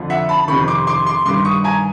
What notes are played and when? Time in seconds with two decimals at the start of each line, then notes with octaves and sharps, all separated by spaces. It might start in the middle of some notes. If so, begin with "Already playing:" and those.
Already playing: F2 D3 F3
0.10 E5 F#5
0.29 A5 B5
0.48 F2 C3 D#3 B5 C#6
0.68 C6 D6
0.87 C6 D6
1.06 C6 D6
1.26 G2 C6 D6
1.30 D#3
1.45 C#6 D#6
1.64 G#5 A#5